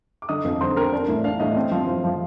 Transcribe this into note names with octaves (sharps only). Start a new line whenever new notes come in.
D6
D3 D#5 D#6
F2
D3 C5 C6
C4 A#4 A#5
D4
A2
D4 F5
A2 D#5
C4
F3
F3
F3